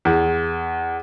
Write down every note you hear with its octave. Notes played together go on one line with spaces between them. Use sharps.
E2